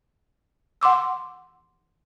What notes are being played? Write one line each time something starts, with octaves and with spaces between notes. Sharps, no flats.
F#5 C6 D6 E6